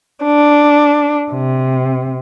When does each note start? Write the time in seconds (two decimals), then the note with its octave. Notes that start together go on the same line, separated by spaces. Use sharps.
0.24 D4
1.32 C3